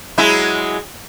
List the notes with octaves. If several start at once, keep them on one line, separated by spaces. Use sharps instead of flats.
F#3 G#3 E4